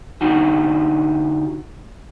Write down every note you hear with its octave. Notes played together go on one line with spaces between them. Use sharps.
D3 D#4 F#4 G4